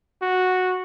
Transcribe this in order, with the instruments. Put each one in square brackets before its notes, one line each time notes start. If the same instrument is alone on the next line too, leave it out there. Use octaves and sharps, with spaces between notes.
[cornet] F#4